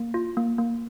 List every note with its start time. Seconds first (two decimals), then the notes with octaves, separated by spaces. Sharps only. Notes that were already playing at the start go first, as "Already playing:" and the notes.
Already playing: A#3
0.14 F4
0.37 A#3
0.58 A#3